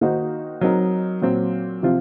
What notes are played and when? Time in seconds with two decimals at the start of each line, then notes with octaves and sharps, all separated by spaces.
0.01 D#3 A#3 D#4 F#4 C5
0.61 F#3 C4 D#4 A#4
1.22 A#2 F#3 C4
1.83 C3 F3 C4 F4